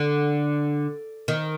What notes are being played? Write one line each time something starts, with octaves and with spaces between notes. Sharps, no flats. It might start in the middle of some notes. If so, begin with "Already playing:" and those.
Already playing: D3
D#3